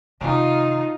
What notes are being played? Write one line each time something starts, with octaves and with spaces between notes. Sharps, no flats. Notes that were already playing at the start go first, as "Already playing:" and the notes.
C3 D#3 D#4 F4